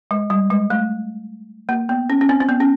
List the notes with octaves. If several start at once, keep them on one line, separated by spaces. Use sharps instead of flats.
G#3
G3
G#3
A3
A#3
B3
C#4
C#4
C4
C4
B3
C#4